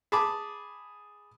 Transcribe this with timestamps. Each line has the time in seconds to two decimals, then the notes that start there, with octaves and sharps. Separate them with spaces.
0.12 G#4 A5 B5 D6